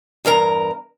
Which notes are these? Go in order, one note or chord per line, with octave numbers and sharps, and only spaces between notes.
E2 G2 A#4 A#5